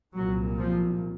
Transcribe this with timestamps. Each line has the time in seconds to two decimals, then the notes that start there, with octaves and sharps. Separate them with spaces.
0.14 C2 A#2 F#3
0.58 F3